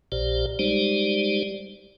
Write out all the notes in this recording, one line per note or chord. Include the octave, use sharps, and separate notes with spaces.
A#1 A#2 G4 C5 D5
G3 G#3 D#4 G4 C5 D5